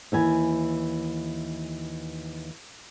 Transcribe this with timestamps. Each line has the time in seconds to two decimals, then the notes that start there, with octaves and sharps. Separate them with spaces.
0.12 D#2 E3 G#5